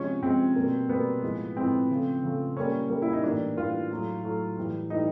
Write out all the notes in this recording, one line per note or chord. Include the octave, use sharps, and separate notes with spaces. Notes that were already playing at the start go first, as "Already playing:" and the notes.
Already playing: C3 F3 G#3 C#4
C3 F3 G#3 C4
B2 G3 A#3
B2 G3 A#3 B3
A2 F3 G#3
A2 F3 G#3 C4
C#3 F3 A3
C#3 F3 A3
A#2 G3 A#3 C#4
A#2 G3 A#3
E4
D#4
A2 E3 G3 A#3 D4
A2 E3 G3 A#3 F4
A2 F#3 A3
A2 F#3 A3
A2 E3 G3
A2 E3 G3 D#4